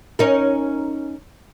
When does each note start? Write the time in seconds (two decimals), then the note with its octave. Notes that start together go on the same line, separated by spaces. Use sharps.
0.19 C#4 D#4 A#4